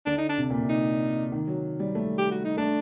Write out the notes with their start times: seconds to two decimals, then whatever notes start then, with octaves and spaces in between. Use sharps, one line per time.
0.06 D3 D4
0.18 D#4
0.29 D4
0.38 C3
0.50 A#2
0.61 C3
0.69 D#4
1.32 D#3
1.47 F#3
1.79 G3
1.95 A3
2.18 G4
2.31 F#4
2.45 D#4
2.57 A3 D4